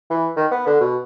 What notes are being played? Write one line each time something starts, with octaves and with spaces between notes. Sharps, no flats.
E3
D#3
B3
D3
B2